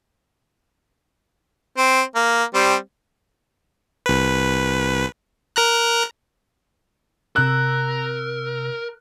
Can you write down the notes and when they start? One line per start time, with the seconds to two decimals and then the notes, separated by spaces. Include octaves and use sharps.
1.78 C4
2.15 A#3
2.55 G3 C4
4.06 C2 B4
5.56 A#4 A#5 F#6
7.36 C3 A#4 E6 F#6